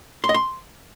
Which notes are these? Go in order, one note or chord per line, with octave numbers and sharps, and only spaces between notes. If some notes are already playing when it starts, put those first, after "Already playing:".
C6
D#5
C6